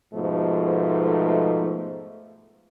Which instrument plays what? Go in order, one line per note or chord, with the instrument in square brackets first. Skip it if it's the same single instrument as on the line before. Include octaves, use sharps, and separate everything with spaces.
[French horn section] G#2 B2 F3 A3